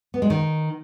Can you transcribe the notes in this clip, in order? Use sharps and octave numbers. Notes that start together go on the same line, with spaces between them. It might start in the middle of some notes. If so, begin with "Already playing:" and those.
B3
G#3
D#3